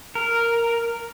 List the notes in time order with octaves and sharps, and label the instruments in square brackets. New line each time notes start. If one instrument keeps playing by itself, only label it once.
[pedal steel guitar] A#4